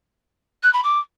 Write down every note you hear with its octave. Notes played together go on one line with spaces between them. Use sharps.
F#6
B5
D6